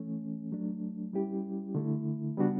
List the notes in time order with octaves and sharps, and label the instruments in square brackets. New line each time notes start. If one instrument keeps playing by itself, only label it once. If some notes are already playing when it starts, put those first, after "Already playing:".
Already playing: [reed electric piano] E3 A3 C#4
F#3 A3 D4
G3 C#4 E4 G4
D3 A3 E4
C#3 G3 B3 D4 F#4